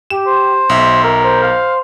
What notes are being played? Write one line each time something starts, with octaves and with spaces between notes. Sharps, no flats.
G4 E7
C5
B1 E5
A#4
C5
F5